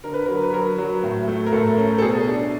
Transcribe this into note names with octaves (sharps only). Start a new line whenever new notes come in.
D3 A#4
B4
F#3 A#4
B4
F#3 A#4
F#3
A2
A3
A#4
A2 A4
C#4
A4
B2 G#4
D4